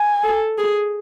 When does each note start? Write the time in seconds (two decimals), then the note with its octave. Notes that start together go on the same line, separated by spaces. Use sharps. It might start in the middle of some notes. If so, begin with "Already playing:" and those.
Already playing: G#5
0.24 A4
0.58 G#4